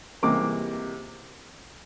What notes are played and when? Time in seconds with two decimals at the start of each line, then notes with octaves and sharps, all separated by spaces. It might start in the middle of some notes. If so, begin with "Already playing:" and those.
0.23 C#2 C3 E3 G3 A#3 D6